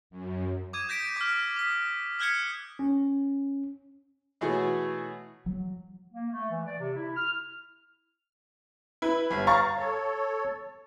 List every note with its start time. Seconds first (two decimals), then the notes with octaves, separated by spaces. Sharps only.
0.10 F#2
0.73 D6 D#6 G#6 D#7
0.89 G6 A#6 B6 D7
1.16 D6 F6
1.56 D#6 B6
2.19 D#6 F6 F#6 G#6 B6 C#7
2.79 C#4
4.41 B2 E3 A3 F#4 G#4 C#5
5.46 F#3
6.12 A#3
6.32 A3
6.50 E3
6.66 D5
6.79 C3
6.96 E4
7.16 F6
9.02 E4 B4
9.30 G1
9.47 F5 A#5 C#6 A6
9.77 A4 C#5